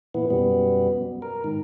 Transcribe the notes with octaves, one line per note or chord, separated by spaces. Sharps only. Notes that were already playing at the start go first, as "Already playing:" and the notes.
A#2 E3 B3
F#2 B2 G3 B3
A#4
G#2 D#3